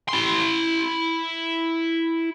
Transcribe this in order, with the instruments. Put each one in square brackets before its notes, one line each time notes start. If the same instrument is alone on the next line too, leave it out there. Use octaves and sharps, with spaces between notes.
[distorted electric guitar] E4 C6